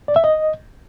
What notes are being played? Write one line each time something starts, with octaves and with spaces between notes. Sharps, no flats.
D5
E5
D#5